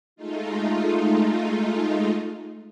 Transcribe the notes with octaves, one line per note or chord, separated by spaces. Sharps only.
G#3 A3 D#4 F4